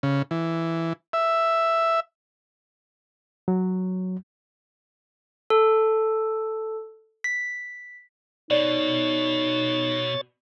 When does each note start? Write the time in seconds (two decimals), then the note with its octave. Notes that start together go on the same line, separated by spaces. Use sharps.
0.03 C#3
0.31 E3
1.13 E5
3.48 F#3
5.50 A4
7.24 B6
8.51 B2 D#4 C#5 D5 A6